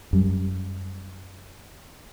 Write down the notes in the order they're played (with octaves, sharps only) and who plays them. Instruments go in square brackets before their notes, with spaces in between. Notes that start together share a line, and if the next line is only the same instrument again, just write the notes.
[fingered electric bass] F#2 G3